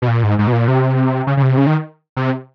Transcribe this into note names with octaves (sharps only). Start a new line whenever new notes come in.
B2
A#2
G#2
G#2
B2
A#2
C3
C#3
C#3
C3
C#3
D#3
C3